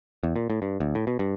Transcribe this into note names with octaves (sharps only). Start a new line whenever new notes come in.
E2
A#2
A2
G2
D2
A2
B2
G2